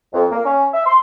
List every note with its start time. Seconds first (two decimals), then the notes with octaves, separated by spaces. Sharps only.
0.14 F2
0.31 A#3
0.45 C#4
0.74 E5
0.86 C6